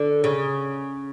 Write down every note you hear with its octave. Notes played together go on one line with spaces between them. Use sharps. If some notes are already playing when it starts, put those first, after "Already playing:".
Already playing: D3
C#3